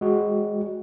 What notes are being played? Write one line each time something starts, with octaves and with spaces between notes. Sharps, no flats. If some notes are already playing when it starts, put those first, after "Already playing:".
G#3 F#4